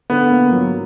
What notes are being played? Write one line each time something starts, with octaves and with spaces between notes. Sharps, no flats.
D3 B3
A#3
F#3